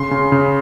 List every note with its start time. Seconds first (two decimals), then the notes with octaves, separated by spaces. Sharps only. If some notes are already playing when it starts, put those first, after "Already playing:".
Already playing: C#3 C6
0.11 C#3
0.32 C#3